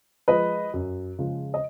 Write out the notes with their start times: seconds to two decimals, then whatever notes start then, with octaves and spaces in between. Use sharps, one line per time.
0.28 F3 G#3 B4 D#5
0.74 F#2
1.19 C#3 F3 G#3
1.54 D#5